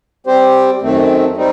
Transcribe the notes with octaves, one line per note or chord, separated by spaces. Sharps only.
G3 C4 G4 C5
F#2 D#3 A3 C4
G3 C4 D#4